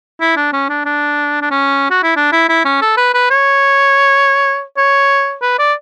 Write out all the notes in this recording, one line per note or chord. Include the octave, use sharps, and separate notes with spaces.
E4
D4
C#4
D4
D4
D4
C#4
F#4
E4
D4
E4
E4
C#4
A4
B4
B4
C#5
C#5
B4
D5